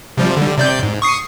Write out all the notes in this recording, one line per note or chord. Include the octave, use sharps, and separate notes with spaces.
C3 F3 G3
D3 G3
C3 D5 G6
G#2
C#6 D#6 C7